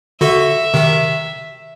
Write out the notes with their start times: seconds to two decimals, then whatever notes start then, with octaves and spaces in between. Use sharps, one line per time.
0.21 D3 F#4 A4 E5
0.74 C3 D#3